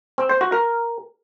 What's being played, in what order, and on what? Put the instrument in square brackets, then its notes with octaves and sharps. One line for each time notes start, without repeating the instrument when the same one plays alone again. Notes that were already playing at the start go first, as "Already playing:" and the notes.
[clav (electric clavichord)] C4
C5
F#4
A#4